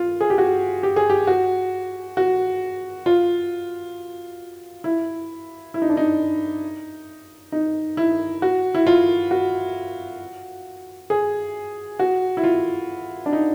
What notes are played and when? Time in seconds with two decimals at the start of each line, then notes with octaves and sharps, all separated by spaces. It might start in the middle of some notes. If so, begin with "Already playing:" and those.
Already playing: F4
0.21 G#4
0.30 G4
0.38 F#4
0.83 G4
0.96 G#4
1.10 G4
1.27 F#4
2.17 F#4
3.06 F4
4.84 E4
5.74 E4
5.82 D#4
5.90 D4
5.97 D#4
7.52 D#4
7.97 E4
8.42 F#4
8.75 E4
8.87 F4
9.31 F#4
11.10 G#4
11.99 F#4
12.37 E4
12.44 F4
13.26 D4
13.33 D#4